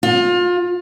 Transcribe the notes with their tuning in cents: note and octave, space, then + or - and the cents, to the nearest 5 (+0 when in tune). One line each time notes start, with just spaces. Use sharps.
F4 +30